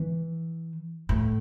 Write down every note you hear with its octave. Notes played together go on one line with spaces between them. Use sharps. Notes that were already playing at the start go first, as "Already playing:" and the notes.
Already playing: E3
A2